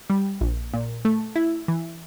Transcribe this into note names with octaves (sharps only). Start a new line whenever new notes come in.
G3
A#1
A#2
A3
E4
E3